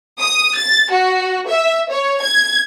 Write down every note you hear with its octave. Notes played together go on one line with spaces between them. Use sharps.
D#6
A6
F#4
E5
C#5
G#6